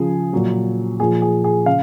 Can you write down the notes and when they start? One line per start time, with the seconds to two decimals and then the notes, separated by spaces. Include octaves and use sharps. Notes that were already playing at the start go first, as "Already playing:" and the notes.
Already playing: C#3 F3 G#4
0.33 A#2 F#3
1.00 A#2 F3 G#4
1.22 G#4
1.44 G#4
1.66 C#3 F5